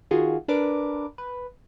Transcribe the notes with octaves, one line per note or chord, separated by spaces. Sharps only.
D#3 F4 F#4 G#4
D4 A#4 B4 D6
B4